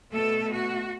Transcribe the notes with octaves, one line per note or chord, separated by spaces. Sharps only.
B2 A3 A4
F#4